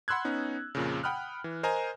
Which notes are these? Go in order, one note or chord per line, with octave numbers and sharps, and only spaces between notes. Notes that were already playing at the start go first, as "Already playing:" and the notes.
F#5 B5 C6 E6 F#6 G#6
B3 C#4 D#4
F2 A#2 C#3
F#5 G5 B5 D#6 F6 F#6
E3
A#4 C5 D#5 G#5 A#5